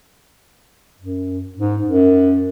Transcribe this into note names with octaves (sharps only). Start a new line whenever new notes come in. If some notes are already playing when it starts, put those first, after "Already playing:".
F#2
G#2
F#2